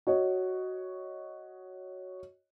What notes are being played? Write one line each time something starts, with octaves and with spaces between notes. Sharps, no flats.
F#4 C#5 D#5